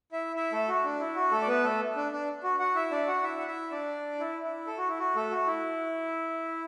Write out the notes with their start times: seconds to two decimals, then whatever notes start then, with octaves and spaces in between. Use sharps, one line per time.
0.12 E4 E5
0.36 E4 E5
0.52 A3 A4
0.68 F#4
0.84 D4
1.00 E4
1.16 F#4
1.31 A3 A4
1.41 D5
1.48 B3 B4
1.64 A3 A4
1.96 D4
2.12 D4
2.44 F#4
2.59 F#4 F#5
2.75 E4 E5
2.91 D4 D5
3.07 F#4 F#5
3.23 E4 E5
3.38 F#5
3.47 E4 E5
3.71 D4 D5
4.20 E4
4.43 E4
4.67 A4
4.78 F#4
4.88 E4
4.99 F#4
5.16 A3 A4
5.31 F#4
5.47 E4